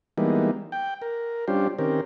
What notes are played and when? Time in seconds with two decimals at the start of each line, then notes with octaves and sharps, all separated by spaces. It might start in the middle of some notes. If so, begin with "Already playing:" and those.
0.18 E3 G3 G#3 A#3 B3 D#4
0.72 G5
1.02 A#4
1.48 G3 C#4 D4 F4 G4 C5
1.79 D#3 C4 C#4 G4 A#4